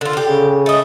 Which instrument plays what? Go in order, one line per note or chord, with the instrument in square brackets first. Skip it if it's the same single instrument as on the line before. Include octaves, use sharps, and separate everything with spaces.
[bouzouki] D3 F4
D3 G4
[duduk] C#3
[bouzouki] A3 D#5